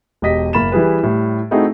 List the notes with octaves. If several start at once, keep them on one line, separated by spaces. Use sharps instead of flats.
E1 G4 D#5 B6
F#1 A#3 B5 A6 E7
E3 G3 G#4 B4
A2 G3
A3 C4 D#4 E4 F#4 G#4